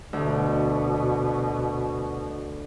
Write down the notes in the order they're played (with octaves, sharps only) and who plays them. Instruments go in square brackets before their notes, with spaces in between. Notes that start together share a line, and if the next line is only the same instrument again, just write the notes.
[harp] D2 [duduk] B2